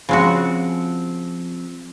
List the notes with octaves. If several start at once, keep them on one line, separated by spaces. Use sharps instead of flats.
C#3 F3 G#3 C4 F#4